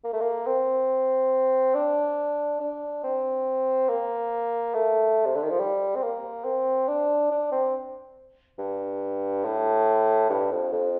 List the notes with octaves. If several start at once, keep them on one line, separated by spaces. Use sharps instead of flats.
A#3
A3
A#3
C4
D4
D4
C4
A#3
A3
C3
D3
D#3
F3
G3
C4
A#3
C4
D4
D4
C4
G2
A2
G2
F2
F2